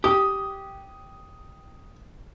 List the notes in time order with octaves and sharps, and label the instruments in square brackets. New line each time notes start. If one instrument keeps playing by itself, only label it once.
[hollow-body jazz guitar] G4 [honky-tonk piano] D#6